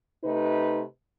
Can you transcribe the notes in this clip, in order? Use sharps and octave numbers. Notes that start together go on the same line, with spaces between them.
C3 A3 D#4 B4